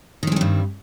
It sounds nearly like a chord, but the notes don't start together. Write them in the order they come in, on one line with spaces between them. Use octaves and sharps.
D#3 C4 G#3 G3 G2